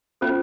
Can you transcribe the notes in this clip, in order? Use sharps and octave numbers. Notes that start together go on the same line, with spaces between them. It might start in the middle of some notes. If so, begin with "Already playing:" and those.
C#4 F4 A4 C5